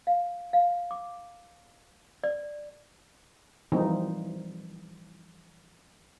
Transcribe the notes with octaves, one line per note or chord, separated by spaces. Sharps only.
F5
F5
D6
D5
E3 F3 G3 A#3 C4 D#4